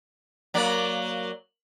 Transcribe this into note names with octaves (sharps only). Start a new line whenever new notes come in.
F#3 A#3 D5